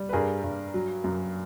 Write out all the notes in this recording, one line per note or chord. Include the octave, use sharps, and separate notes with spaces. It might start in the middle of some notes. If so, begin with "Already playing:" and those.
Already playing: G3
B4
G2 G#4 A#4
G2
F#3
F#2